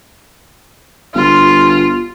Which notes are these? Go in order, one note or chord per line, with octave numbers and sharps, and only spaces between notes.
G1 F4